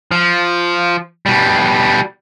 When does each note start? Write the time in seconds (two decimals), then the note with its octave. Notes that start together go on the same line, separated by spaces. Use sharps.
0.11 F3
1.26 B2 G3